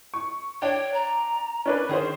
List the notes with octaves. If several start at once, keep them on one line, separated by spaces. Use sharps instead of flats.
C#6
D4 C#5 G5
A#5
C#4 D4 B4
D#3 C#4 G#4 C5